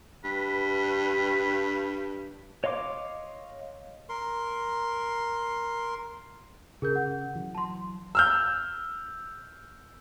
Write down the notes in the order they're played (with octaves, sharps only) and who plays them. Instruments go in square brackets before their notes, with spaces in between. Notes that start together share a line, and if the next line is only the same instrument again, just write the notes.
[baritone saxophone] G2 [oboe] B4
[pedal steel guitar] C#5 D#5 F5 C6 D6
[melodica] A#4 C6
[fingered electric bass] C#3 [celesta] G#4 A#4 G6
[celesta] F#5
[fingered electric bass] E3 F#3
[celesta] A5 C6
[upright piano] E6 F6 G6